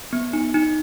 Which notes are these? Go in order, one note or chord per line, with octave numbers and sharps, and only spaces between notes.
B3
D#4
D#4